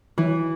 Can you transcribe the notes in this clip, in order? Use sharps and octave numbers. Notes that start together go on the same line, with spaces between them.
E3